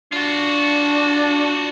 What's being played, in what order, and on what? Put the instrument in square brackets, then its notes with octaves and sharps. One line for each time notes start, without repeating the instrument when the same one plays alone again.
[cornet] D4 [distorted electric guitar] F4 F#4